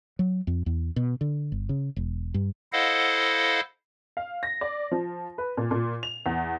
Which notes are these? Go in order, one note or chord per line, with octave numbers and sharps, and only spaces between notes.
F#3
F2
E2
B2
D3
G1
C#3
E1
G2
E4 A4 C5 D#5 F5 F#5
F5
A#6
D5
F3
B4
A#2
A#2
F7
E2